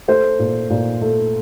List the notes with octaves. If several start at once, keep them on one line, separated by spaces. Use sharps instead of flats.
A3 C5
A#2
A#2
A3